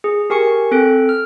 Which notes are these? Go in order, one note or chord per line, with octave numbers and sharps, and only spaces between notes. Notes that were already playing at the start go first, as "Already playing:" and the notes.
G#4
G4 A#4 G#5 C#6 C#7
C4 A4 F#6 D7
F6